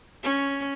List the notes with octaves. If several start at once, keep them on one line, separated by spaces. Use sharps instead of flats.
C#4